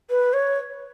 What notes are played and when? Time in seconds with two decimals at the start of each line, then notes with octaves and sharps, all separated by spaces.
0.10 B4
0.33 C#5